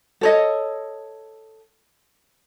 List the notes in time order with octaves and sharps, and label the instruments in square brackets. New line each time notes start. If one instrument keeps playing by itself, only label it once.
[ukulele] A4 C#5 D#5